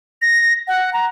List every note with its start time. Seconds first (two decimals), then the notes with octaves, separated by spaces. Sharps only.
0.22 A#6
0.68 F#5
0.93 A#5